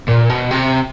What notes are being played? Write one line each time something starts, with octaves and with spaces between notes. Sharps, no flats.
A#2
B2
C3